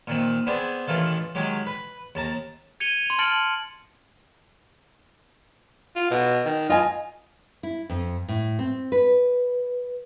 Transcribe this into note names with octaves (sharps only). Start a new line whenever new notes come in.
A#2 D#3 C4
B3 C4 D4 G#4 C5
A1 D#3 E3 F4 A4
D#3 F#3 G#3 G4
B4
D#2 A5 A#5
G#6 C#7 D#7 F7 G7
C6 F7
A5 F6 A6 C#7 D7 F#7
F4
B2
D#3
F4 D#5 G#5
E4
F2
A2
C4
B4